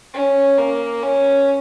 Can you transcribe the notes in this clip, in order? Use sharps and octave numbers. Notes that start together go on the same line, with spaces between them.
C#4
A#3
C#4